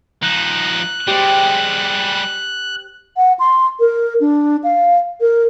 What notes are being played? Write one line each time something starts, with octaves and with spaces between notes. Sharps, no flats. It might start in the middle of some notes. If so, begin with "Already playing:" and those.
F3 D#4 F#6
G3 G#3 G4 C5
F#5
C6
A#4
D4
F5
A#4